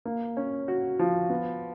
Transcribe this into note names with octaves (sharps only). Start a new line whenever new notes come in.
A#3
C#4
F#4
F3
B3